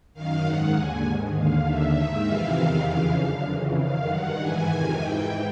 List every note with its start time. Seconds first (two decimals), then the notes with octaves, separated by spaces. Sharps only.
0.14 F#2 D#3 F5
0.44 G#2 D#3 F#5
0.74 D#2 D3 G#5
1.05 G#2 D#3
1.36 D#2 D3 F5
1.66 D#2 D3 E5
1.96 G#2 D#3
2.26 F2 C3 E3 F5
2.57 E2 C3 D#3
2.88 F2 C#3 E3
3.18 F#2 D3 F5
3.48 F2 C#3 E3
3.79 F#2 D#3 F5
4.09 G2 D#3 F#5
4.40 G#2 E3 G#5
4.70 F2 C3 D#3 G#5
5.00 G#2 E3 G5